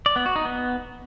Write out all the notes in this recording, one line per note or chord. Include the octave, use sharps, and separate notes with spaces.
D5
B3
F#4
D#4
B3